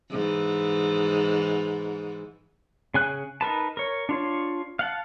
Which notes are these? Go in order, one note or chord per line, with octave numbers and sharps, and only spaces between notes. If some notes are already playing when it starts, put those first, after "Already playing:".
G#2 E3
C#3 G#5 F#6
D#4 A#4 B4 A5
A#4 C#5
D4 F4 C#5
F5 F#5 A5